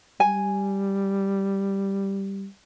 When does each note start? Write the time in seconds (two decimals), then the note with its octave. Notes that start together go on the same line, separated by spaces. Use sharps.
0.20 G3 G#5